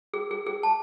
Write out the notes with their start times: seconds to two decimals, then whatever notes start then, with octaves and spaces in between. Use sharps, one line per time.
0.14 G#4
0.31 G#4
0.47 G#4
0.63 A5